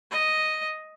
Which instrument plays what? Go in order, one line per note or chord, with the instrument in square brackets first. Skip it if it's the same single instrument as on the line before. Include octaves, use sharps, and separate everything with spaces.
[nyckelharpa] D#5